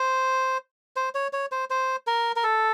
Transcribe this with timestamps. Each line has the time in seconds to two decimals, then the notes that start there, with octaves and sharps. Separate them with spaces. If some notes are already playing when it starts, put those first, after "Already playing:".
Already playing: C5
0.96 C5
1.15 C#5
1.33 C#5
1.52 C5
1.70 C5
2.07 A#4
2.36 A#4
2.44 A4